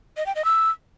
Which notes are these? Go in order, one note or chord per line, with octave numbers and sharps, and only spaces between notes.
D#5
G5
D#5
E6